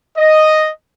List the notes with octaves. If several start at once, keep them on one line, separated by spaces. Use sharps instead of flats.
D#5